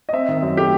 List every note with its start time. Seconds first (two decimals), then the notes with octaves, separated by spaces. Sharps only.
0.09 D#5
0.13 C4 E5
0.28 D#3
0.43 F#2
0.57 A3 G4